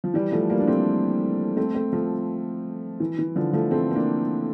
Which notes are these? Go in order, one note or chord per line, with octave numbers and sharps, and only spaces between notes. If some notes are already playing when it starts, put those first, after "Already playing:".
F3
E3 G3
F3 A3
G3 A#3
D4
A3 C4
A3 C4
A3 C4
F3 A3
E3
E3
D3 F3
F3 A3
A3 C4
C4
A#3 D4